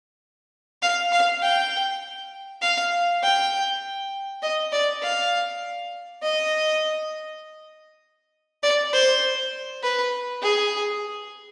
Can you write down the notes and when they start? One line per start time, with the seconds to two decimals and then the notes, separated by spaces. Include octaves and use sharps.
0.82 F5
1.12 F5
1.42 G5
2.62 F5
3.23 G5
4.42 D#5
4.72 D5
5.03 F5
6.22 D#5
8.63 D5
8.93 C5
9.83 B4
10.43 G#4